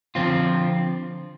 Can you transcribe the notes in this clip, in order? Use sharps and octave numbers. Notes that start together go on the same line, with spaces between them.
D3 F3 C4 F4